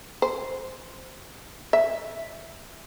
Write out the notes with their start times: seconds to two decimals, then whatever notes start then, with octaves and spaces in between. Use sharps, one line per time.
0.22 C5
1.73 E5